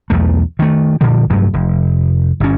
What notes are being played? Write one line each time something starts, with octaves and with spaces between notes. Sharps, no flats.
B1 E2 A3
D#3 A3
A#2 D3 F3 G3
F1 G2 F#3 A3
F1
G1 G2 C#4